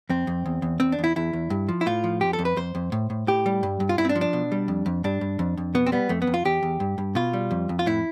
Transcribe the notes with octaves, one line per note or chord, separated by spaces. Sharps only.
F2 C4
F2
E2
E2
E2 C4
D4
E2
E4
E2 E4
E2
G2
F3
E4
A2 F4
F3
F2 G4
A4
F2
B4
F2 C5
F2
A2
A2
A2 G4
G3
G2
G2
F4
G2 E4
C4
D4
F3
D4
B2
G3
F2
F2
G2 D4
G2
F2
F2
B2 B3
C4
G3 B3
F2 A3
B3
F2
F4
E2 G4
E2
G2
G2
B2 F4
G3
F2
F2
F4
A2 E4